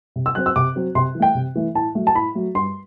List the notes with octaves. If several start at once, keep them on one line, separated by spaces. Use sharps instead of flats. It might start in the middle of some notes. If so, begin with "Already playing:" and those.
C3
E6
F#3 C4 F#6
E6
C3 D6
F#3 C4
C3 C6
E3
A3 G5
C3
E3 A3
A2 A5
F#3 A3
A5
A2 B5
F#3 A3
G2 C6